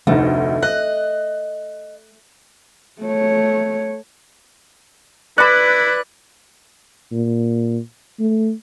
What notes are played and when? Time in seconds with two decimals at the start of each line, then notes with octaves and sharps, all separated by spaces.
0.07 F1 D2 A3 D#4
0.63 D#5 F#6
3.02 A3 C#5
5.38 E4 B4 D5 B5 F#6
7.12 A#2
8.20 A3